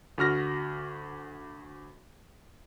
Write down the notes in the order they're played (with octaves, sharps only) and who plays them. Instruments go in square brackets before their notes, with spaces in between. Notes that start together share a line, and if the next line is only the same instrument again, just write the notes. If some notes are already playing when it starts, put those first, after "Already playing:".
[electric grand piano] D2 F#4 F6 A#6